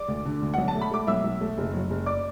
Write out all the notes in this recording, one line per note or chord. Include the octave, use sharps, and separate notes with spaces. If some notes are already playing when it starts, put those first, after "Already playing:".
Already playing: D5 D6
D2
D3
D2
B1 F#5
A5
A3
B5
A3 D6
B1 E5 E6
B1
A3
F#1
F#3
F#1
D5 D6